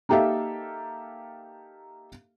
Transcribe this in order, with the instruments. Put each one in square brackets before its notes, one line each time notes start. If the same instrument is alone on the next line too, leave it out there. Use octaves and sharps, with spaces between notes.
[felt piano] A#3 D#4 G4 A4 E5 F5